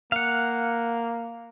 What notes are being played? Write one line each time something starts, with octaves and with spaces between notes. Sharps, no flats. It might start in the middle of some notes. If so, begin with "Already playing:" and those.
A#3 F5 F#5